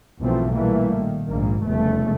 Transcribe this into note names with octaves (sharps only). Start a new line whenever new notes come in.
B1 F#2 E3 F3 A3 C4
A#2 E3 G3 A3 A#3
D#3
A#1 G#2 A#3
F1 E2 C#3 G3 A3